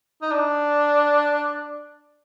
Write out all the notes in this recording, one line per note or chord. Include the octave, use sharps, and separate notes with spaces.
D#4
D4